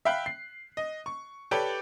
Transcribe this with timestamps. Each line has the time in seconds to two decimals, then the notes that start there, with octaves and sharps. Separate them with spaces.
0.05 E5 F5 G5 B5 F#6
0.26 C7
0.77 D#5
1.06 C#6
1.51 G4 A4 B4 C#5 D5 G5